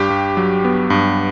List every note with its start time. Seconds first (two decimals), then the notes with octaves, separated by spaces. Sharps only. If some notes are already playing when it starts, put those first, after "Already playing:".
Already playing: G2 G4
0.10 G2
0.37 F#3
0.65 B3
0.90 G2